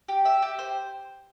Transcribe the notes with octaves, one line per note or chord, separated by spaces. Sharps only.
G4
E5
G4
C5